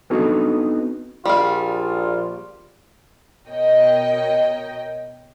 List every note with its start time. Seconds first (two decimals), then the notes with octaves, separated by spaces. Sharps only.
0.10 B3 C4 D4 D#4 F#4 A4
1.25 A#1 G3 F4 F5
3.48 B2 A#4 C#5 D#5 G5